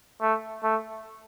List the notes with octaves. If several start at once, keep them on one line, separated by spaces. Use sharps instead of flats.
A3
A3